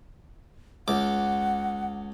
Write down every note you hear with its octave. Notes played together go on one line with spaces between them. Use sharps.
C#2 F#5 D6